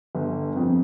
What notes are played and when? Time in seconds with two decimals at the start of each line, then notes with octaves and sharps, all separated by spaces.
0.15 G1
0.56 F2 F3